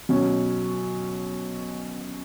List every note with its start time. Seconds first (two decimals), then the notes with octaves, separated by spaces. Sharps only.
0.09 B2 F#3 C#4